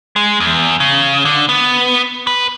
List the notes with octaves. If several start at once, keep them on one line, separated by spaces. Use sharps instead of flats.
G#3
E2
C#3
D3
B3
B4